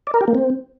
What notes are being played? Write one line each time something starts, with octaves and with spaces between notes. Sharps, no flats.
D5
A#4
G4
A#3
C4